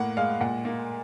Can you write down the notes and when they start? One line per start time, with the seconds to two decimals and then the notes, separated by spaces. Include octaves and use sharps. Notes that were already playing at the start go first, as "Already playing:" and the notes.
Already playing: A2 A#3 F#5
0.17 G#3 F5
0.41 A#2 F#5
0.65 A#3